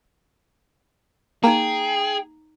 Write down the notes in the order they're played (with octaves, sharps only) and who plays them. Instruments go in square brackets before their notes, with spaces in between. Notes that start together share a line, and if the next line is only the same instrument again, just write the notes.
[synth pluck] A#3 [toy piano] D#4 A#5 [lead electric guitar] G#4 [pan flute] G5